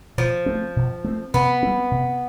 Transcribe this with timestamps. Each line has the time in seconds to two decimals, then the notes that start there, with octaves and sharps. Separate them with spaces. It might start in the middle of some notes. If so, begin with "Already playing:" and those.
0.18 B2 F3
0.46 A3 C4
0.76 B2
1.04 A3 C4
1.34 C3 B3
1.63 G3 C4
1.91 C3